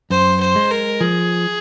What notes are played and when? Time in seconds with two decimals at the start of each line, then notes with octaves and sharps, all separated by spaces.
0.10 F#2 C5
0.40 C5
0.56 G#3
0.71 A#4
1.01 F3 G#4